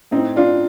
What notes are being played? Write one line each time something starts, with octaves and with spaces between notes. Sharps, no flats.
A2 C4 D#4
D4 F4